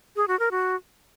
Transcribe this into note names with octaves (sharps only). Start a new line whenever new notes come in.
G#4
F#4
A#4
F#4